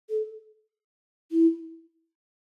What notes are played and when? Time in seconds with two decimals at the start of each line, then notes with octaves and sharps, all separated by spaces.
0.09 A4
1.31 E4